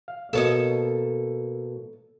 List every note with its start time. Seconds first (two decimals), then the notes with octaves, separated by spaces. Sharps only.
0.08 F5
0.33 B2 A#3 A4 C#5 D#5